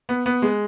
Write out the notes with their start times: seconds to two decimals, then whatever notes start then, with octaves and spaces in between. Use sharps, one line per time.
0.09 B3
0.26 B3
0.42 G#3